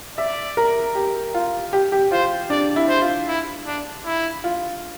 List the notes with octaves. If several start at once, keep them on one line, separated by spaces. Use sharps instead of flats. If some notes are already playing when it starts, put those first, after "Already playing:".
D5 E5
A#4
G4
F4
G4
G4
F4 C5
D4 D5
E4
C5
F4
E4
D4
E4
F4